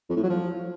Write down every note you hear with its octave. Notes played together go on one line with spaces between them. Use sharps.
F2
A2
F#3
F3